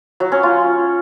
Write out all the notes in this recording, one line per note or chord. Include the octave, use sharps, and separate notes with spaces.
F#3
C#4
F4